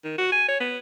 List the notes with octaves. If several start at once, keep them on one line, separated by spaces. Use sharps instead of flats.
D#3
F#4
G#5
C#5
B3